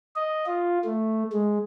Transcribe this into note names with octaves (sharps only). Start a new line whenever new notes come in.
D#5
F4
A3
G#3